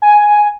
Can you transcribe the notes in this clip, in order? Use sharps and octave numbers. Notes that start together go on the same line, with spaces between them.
G#5